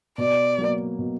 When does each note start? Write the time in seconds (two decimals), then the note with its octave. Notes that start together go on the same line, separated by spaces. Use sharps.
0.18 B2 D5
0.58 F#3 A#3
0.99 B2